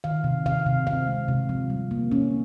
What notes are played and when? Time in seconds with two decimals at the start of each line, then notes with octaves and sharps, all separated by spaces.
0.04 D#3 F5
0.24 C3
0.46 C3 F5
0.66 C3
0.87 C4 F5
1.07 G#3
1.28 C3
1.49 F3
1.70 G3
1.91 A#3
2.12 C#4